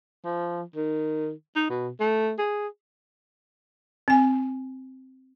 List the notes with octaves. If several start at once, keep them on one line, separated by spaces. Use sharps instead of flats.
F3
D#3
D#4
B2
A3
G#4
C4 G#5